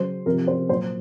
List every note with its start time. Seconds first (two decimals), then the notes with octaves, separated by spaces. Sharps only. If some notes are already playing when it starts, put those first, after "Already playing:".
Already playing: C#3 F#3 C5
0.26 C3 F3 A#4
0.47 C5
0.69 A#2 F#3 C5